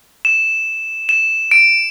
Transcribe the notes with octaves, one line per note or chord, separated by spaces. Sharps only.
E7
E7
D7